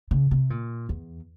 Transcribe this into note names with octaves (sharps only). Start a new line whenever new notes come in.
C#3
C3
A#2
E2